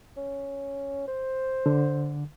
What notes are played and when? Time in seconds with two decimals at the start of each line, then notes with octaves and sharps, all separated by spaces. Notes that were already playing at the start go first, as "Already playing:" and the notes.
0.17 C#4
1.08 C5
1.66 D3